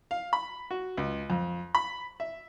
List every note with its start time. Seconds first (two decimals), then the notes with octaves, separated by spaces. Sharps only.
0.11 F5
0.33 B5
0.71 F#4
0.97 C#2
1.30 F2
1.75 B5
2.20 E5